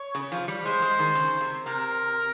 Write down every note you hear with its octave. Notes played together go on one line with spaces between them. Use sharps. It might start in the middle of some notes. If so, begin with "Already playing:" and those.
Already playing: C#5
C#3
F3
G3
G#3 C5
G#3
D#3
C#3
C3
C3 A#4